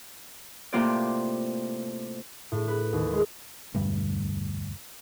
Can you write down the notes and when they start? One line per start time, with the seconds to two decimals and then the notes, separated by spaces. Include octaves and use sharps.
0.73 A2 C3 A#3 C4 F4 D5
2.52 A2
2.68 B4
2.93 D#2
3.11 G#3
3.74 E1 D2 G2 G3